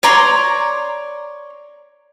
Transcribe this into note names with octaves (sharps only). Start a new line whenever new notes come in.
C#5 D5 A#5 C6